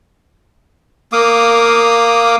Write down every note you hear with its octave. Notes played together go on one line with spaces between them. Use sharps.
A#3 F5 D6 D#6